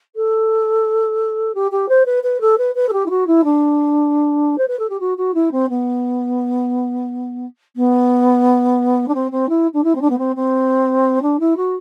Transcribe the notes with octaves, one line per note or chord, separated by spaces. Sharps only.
A4
G4
G4
C5
B4
B4
A4
B4
B4
A4
G4
E4
F#4
E4
D4
C5
B4
A4
G4
F#4
F#4
E4
C4
B3
B3
D4
C4
C4
E4
D4
E4
C4
D4
B3
C4
C4
D4
E4
F#4